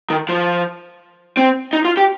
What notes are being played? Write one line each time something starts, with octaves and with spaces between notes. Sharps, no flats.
D#3
F3
C4
D#4
F4
G4